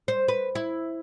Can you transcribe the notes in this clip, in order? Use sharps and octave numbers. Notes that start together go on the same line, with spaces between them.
C5
B4
E4